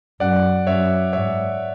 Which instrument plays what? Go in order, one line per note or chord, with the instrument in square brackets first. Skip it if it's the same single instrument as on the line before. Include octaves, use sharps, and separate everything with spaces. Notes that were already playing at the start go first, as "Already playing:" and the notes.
[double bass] F#2 [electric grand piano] D5 F#5
[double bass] F#2 [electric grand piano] C#5 E5
[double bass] G#2 [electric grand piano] C#5 E5